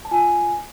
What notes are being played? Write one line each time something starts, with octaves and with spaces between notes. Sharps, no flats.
A5
F4 G#5